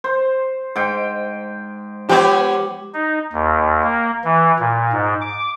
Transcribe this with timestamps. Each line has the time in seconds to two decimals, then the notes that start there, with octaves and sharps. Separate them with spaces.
0.04 C5
0.76 G#2 G5
2.09 F3 B3 G4 C#5
2.94 D#4
3.33 D#2
3.84 A#3
4.24 E3
4.59 A#2
4.93 G#2
5.21 D6